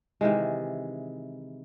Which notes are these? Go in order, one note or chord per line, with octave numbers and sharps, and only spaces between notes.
C3 D#3 E3 G#3